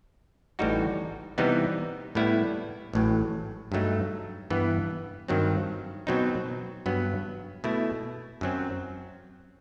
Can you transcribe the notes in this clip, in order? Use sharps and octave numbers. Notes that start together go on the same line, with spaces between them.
A1 A2 G3 D#4 F#4
C3 E3 G3 B3 D#4
A2 G3 B3 E4
A1 A2 F#3
G2 F#3 A3 D#4
G2 E3 B3
G2 D#3 F#3 C4
B2 F#3 C4 D#4
G2 F#3 B3
B2 A3 E4
F#2 F#3 C4